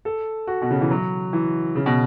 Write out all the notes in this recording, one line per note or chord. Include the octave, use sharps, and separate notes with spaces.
A4
F#4
B2
C#3
E3
F#3
E3
C#3
B2